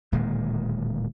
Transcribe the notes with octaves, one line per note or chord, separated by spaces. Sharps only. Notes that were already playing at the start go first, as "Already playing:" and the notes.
D1 A#2 D#3 G#3